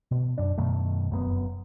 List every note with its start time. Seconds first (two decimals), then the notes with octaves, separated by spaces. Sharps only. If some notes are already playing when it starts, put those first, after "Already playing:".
0.11 B2
0.38 F#2 D4
0.58 F#2 B2 D#3 A3
1.10 F1 F#2 A2 B3